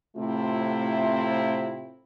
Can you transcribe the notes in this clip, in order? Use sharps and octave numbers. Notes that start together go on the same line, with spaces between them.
A2 C3 A3 C4 E4 F4